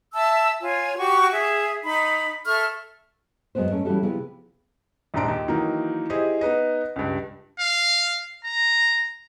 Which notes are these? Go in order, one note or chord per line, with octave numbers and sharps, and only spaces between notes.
E5 A5 E6
F4 C#5 G#5
F#4 G4 C#6
G#4 E5
D#4 B5
A4 E5 C#6 F6
F#2 F#3 G#3 A3 B3 C5
G#2 A3 C#4
E3 G3 C#4 F#4 G4 A4
C3 F3 B3 E4 G4 G#4
A#1 D#2 G#2 D4 A#5 D7
D#2
D#3 E3 F#3 A#3 D#4
E4 G4 G#4 C5 D#5
B3 D#4 B4 D#5
C#2 G2
F5
A#5